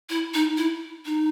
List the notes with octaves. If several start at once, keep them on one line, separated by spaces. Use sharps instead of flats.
E4
D#4
E4
D#4